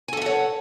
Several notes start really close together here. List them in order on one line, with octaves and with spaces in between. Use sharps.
G#5 A4 E5 F#5 C#5